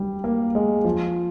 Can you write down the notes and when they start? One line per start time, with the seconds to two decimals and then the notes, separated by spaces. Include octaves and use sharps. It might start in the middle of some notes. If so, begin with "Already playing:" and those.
Already playing: F#3 G3
0.24 A#3
0.55 G#3
0.85 F3